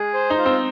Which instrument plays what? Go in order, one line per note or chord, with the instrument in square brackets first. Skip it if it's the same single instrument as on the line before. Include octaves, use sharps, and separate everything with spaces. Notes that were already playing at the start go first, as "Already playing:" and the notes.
Already playing: [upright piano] G#3 [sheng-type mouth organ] G#4
[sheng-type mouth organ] C5
[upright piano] D#4
[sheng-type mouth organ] F4
[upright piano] C4